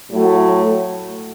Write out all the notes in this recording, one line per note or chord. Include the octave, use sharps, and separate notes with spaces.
A2 F#3 A3